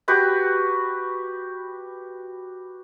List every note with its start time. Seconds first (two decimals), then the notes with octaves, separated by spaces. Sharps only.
0.08 F#4 G4 B4 B5